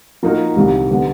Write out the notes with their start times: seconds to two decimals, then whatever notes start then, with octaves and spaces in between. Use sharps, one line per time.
0.23 F3 A#3 D#4 F#4 A#4
0.56 C2 C3 D#3 G3
0.91 D3 G3 B3